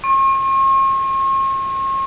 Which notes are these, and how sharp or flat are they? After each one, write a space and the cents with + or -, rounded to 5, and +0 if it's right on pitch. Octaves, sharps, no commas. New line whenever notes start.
C#6 -45